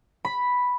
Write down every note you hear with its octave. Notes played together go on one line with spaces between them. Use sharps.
B5